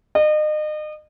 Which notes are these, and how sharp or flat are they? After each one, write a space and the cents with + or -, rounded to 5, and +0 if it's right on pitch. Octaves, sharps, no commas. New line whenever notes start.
D#5 -35